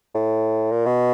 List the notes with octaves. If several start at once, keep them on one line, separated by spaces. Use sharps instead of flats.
A2
A#2
B2